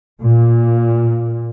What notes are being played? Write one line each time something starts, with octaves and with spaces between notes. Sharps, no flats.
A#2